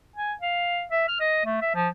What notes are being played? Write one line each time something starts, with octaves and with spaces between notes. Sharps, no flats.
G#5
F5
E5
F6
D#5
A3
E5
F3